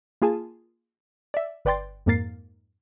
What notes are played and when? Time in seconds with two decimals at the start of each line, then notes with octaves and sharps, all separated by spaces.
0.22 A#3 F4 G#4 G#5 A5
1.34 D5 E5
1.65 G1 B4 D5 G5 C6 A6
2.06 F2 G#2 A#3 A#4 A6 C7